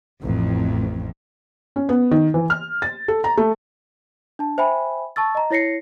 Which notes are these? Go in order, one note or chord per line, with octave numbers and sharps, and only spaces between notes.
A1 F2
C#4
B3
D#3
E3
F6
A6
A4
A#5
A3
D4 A5
C5 E5 G5 G#5 B5
A5 C#6 E6 A6
D#5 A#5
E4 C#5 A#6 C7 C#7